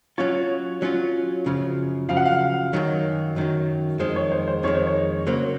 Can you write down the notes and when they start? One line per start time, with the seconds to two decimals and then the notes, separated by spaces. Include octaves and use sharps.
0.18 F#3 C#4 F4 C#5
0.82 F#3 C#4 F4
1.46 F#2 C#3 F3
2.09 F#2 C#3 F3 F5
2.17 F#5
2.25 F5
2.73 F#2 D#3 F#3
3.36 F#2 D#3 F#3
3.99 F2 D#3 G#3 C5
4.16 C#5
4.32 C5
4.48 C5
4.63 F2 D#3 G#3 C#5
4.75 C5
4.87 C#5
5.27 C#3 F#3 A#3 C5